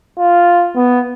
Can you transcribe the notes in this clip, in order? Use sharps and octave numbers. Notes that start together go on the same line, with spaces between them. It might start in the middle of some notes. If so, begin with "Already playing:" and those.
F4
B3